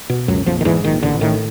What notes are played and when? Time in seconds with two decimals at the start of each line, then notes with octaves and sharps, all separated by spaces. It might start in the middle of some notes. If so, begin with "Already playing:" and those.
0.10 B2
0.28 C#2 F#2 F#3
0.46 A#1 F2 F3
0.61 D#3
0.65 E2 G#2 E3
0.84 A#1 D#3
1.03 A1 D3
1.21 A2 D#3